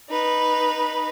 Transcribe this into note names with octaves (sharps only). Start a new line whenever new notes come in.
D#4 B4